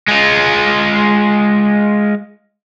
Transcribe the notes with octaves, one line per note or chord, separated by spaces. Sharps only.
G#3 F4